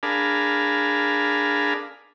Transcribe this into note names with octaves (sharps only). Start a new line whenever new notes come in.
D4 G#4 A#4 F5 A5 B5